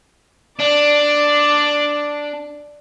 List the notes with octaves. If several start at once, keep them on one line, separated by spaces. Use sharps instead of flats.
D4 D5 D6